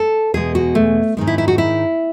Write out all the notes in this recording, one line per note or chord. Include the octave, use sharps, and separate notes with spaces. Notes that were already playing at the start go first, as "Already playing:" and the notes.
Already playing: A4
E2 B2 G#3 G#4
F#4
A3
G#2 D#3 G#3
E4
E4
F#4
E4